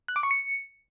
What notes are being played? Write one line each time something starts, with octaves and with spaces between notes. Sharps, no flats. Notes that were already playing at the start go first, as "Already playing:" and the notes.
F#6
D6
C#6
C#7